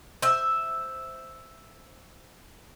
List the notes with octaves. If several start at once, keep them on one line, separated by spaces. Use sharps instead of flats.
C5 E5